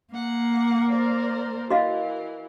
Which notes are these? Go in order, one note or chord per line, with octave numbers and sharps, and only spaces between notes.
A#3 F#5
A#4 C5 D5
E3 F#4 A#4 D#5 F5